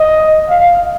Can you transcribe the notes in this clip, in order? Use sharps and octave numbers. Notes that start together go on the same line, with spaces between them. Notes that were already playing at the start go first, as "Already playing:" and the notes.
Already playing: D#5
F5